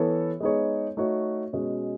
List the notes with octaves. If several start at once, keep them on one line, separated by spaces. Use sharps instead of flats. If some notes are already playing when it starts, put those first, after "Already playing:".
Already playing: E3 B3 E4 A4 C#5
G#3 B3 D#4 G#4 C#5
A3 D#4 F#4 C#5
B2 G#3 C#4